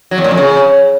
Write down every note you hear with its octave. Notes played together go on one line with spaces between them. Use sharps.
F#3
E2
A#2
F2
C#3